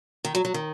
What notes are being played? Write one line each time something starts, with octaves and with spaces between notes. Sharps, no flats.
D#3
F#3
F#3
D#3